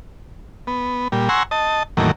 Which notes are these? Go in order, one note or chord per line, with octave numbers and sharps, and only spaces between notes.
B3
A#2 G3
F#5 G#5 A#5 C6 C#6 E6
D#5 A5
E2 A2 D#3 F#3 A#3